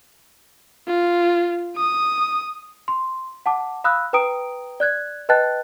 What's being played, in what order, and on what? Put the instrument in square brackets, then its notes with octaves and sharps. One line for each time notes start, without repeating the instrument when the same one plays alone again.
[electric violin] F4
D#6
[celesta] C6
F#5 A5 D6
F5 B5 D#6 E6 F#6
B4 G5 A#5 D#6 D7
D5 F#6 G#6
B4 D#5 G5 A5 F#6 A6